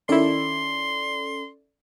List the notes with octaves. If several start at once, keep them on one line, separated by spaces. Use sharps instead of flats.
D#3 C#4 E4 A4 D5 C6